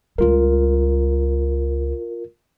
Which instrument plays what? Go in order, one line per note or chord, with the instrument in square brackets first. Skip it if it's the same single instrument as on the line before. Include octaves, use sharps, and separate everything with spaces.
[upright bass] C#2 G3 [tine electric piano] F4 A#4